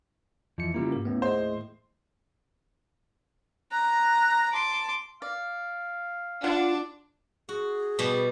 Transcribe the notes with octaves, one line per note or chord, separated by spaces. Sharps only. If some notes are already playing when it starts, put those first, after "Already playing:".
F2 E3 F3 C#7
C#3 G3 A#3 E4 F4
G#2 A#4
D#2 A2 B3 C#4
G#4 C5 D#5
A#5 F#6
A5 C6 D6
D5 F5
D4 F4 F#5
F#4 G#4
B2 G3